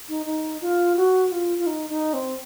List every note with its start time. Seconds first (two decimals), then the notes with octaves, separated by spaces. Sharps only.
0.09 D#4
0.26 D#4
0.61 F4
0.97 F#4
1.32 F4
1.58 F4
1.66 D#4
1.90 D#4
2.13 C4